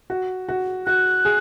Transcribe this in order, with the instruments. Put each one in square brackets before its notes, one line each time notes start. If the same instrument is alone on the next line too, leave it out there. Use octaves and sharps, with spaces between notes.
[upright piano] F#4
F#4
[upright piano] F#4 [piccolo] F#6
[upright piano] G#4